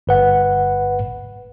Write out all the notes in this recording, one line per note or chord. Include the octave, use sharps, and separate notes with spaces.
G1 B4 F#5